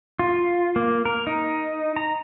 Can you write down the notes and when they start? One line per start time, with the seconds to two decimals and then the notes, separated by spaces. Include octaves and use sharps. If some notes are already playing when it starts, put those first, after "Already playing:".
0.19 F4
0.76 A#3
1.05 A#4
1.27 D#4
1.96 A#5